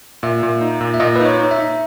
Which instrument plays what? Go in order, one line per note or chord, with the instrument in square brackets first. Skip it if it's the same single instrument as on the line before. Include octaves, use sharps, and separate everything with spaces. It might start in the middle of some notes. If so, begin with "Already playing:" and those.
[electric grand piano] A#2 [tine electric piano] E5
[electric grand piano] A#2
D#4
A#2
[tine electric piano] E5
[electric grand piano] A#2 [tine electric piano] D#5
[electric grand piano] D#4 [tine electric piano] B4
[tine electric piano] C#5
[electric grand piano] D#4
[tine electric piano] E5
[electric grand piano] D#4